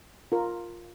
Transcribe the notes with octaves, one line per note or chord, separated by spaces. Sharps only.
F4 A#4